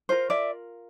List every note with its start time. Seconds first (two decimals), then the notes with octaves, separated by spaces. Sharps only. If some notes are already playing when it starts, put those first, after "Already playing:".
0.09 F4 A#4 C5
0.30 D5 E5